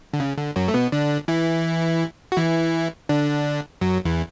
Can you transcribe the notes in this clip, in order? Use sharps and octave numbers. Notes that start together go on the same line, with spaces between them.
D3
C#3
D3
F#2 F#3
A3
B2 B3
D3 D4
E3 E4
F#4
E3 E4
D3 D4
F#2 F#3
E2 E3